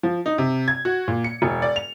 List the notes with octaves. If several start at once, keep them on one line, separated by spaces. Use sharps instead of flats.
F3
D#4
C3
G#6
F#4
A#2
C#7
E1
D5
F7